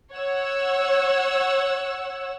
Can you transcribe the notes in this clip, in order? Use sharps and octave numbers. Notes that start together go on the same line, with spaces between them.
C#5 F#5 E6